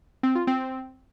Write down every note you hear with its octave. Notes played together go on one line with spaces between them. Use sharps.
C4
F4
C4